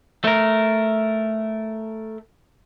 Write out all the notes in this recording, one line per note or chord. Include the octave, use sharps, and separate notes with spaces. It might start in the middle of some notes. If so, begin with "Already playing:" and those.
A3 A#4